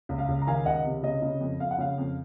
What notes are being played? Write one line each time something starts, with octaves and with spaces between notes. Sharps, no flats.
C#2
F5
C#2
A#5
D#3 F5 G#5
C#2 D#5 F#5
C3
C#3 D#5
C#3
F2
F2 F5
F#5
C#3 F5
F2